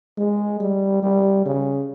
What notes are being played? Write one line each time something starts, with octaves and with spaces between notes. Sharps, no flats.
G#3
G3
G3
C#3